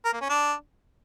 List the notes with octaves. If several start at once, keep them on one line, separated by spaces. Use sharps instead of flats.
A#4
A#3
C#4
D4